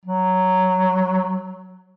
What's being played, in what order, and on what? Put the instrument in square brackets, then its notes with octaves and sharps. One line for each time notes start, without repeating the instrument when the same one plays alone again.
[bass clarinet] F#3